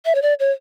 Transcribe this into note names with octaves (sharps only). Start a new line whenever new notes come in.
E5
C#5
D5
C#5